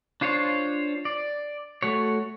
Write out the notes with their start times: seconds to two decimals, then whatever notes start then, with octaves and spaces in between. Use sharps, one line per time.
0.21 D4 F4 C5 C#5
1.05 D5
1.83 A3 F#4 C#5